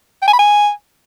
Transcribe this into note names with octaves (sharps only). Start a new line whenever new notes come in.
G5
G#5
B5
G#5